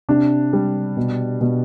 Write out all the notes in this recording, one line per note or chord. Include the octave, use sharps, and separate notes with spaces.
C3 D4
G3
B2
B2